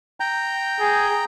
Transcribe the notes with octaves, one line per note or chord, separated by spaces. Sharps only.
G5 A#5 G6
G#4